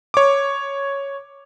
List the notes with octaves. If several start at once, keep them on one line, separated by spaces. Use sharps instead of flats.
C#5 D6